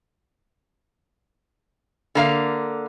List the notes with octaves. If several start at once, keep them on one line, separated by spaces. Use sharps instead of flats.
D3 A#3 F5